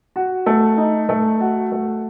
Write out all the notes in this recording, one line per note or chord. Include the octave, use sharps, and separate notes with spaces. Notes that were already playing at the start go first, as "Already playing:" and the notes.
F#4
A3
D#4
A3
F#4
A3